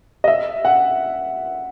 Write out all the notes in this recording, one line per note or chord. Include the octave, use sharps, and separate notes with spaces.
D#5
E5
F#5